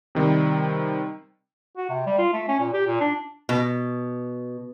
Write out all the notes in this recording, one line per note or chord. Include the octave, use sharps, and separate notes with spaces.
C3 D#3 G3 C4
F#4
C3
G3
F4
A3
C#4
A#2
G4
A#2
D4
B2